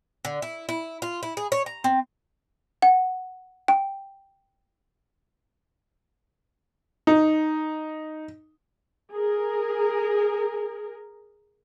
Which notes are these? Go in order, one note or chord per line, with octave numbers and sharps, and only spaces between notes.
D3
E4
E4
F4
E4
G#4
C#5
A#5
C4
F#5
G5
D#4
G#4 A#4